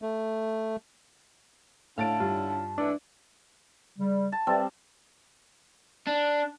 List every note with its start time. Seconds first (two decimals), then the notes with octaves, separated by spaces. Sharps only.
0.02 A3
1.98 A2 D3 C#4 E4 F5 A5 A6 D7
2.20 G2 F4
2.78 G#2 E3 A3 D4 D5
3.99 C#3 G3
4.32 A5
4.47 G3 C4 A4 B4 D5 E5
6.07 D4